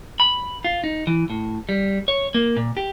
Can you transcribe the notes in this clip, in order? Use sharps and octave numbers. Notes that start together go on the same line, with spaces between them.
B5
F4
D#4
E3
A2
G3
C#5
A#3
A#2
G4